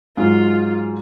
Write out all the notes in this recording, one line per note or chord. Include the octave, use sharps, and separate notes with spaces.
G#2 F#3 G#3 F4